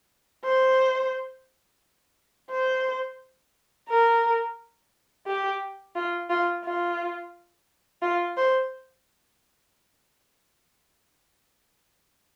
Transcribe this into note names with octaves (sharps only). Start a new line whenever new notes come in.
C5
C5
A#4
G4
F4
F4
F4
F4
C5